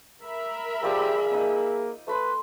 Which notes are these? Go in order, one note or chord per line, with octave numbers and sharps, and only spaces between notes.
A#4 E5 B5
F3 G4 G#4 D5 E6
A#3 D#4 D#5
A3 B4 B5 C6